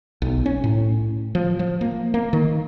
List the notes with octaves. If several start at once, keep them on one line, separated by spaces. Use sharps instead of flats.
B1
C#4
A2
F3
F3
A#3
A#3
D#3